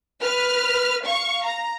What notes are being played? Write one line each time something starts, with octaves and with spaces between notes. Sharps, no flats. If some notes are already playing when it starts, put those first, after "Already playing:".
B4 F6
F5 C#6
A#5